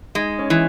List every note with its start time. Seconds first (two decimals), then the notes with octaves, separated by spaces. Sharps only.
0.15 G#3 D#4
0.39 C#4
0.50 E3